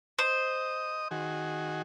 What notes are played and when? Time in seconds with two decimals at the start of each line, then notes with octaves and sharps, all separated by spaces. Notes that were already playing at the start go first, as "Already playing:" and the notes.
0.19 C5 D#5 D#6
1.11 D#3 F#4 G#4